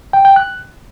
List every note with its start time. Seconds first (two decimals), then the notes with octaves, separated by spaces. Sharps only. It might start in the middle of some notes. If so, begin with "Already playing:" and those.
0.13 G5
0.25 G5
0.36 F#6